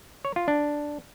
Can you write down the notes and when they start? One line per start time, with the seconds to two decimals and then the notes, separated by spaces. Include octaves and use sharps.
0.25 C#5
0.36 F4
0.48 D4